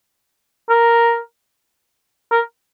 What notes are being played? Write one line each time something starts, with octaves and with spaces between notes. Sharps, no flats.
A#4
A#4